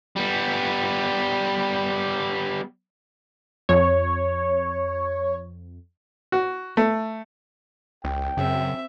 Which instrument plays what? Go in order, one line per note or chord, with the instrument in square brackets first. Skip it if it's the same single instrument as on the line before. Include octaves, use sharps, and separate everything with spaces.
[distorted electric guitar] G3 B3
[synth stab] F2 [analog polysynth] C#5
[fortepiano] F#4
A3
[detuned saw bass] C#2 [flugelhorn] G5
[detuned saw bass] F#2 [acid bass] C#3 [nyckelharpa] C4 E5